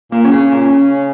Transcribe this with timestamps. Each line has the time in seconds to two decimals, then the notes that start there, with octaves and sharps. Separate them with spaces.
0.12 A#2 A#3
0.25 C#4
0.31 C#3
0.38 C#4
0.51 A#2
0.71 C#3